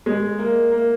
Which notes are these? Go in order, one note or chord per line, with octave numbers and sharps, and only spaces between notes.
G#3
A#3
A#3